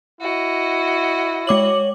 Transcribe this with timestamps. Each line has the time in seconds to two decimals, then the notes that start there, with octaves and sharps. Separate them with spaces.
0.21 E4 F#4 D#5
1.47 G#3 C#5 D6 F#7